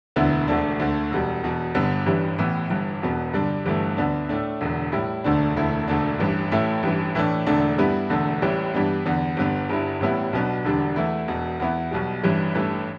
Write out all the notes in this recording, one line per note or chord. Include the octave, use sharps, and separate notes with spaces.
E1 D2 D3 B3 E4
E1 D2 D3 A3 D4
D2 D3 A3
E1 E2 B2 G3
E1 E2 B2
G1 G2 D3 B3
A1 G2 E3 G3
A1 A2 E3 B3
G1 G2 E3
E1 E2 B2 B3
G2 D3 G3 D4
G1 G2 E3 A3
D2 D3 B3 D4
A2 A3 D4
E1 E2 D3
A2 G3 E4
E1 D2 D3 A3 D4
E1 D2 D3 A3 E4
E1 D2 D3 A3 D4
A1 G2 E3
A1 A2 A3 E4
A1 G2 E3
A2 E3 A3 D4
E1 E2 D3 A3 D4
G2 G3 B3 E4
E1 E2 D3 A3
A1 A2 E3 G3
G2 E3 G3 B3 D4
E2 D3 B3
G1 G2 D3 B3
G1 G2 G3 E4
A1 A2 G3 B3 E4
B1 B2 B3 D4
E1 E2 D3 G3 D4
E2 E3 A3 E4
E1 E2 B2
E2 E3 B3 E4
B1 B2 G3
A1 G2 E3 G3
A1 G2 E3 A3